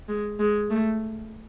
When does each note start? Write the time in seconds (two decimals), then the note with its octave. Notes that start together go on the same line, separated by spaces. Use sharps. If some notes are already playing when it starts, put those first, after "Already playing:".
0.08 G#3
0.39 G#3
0.70 A3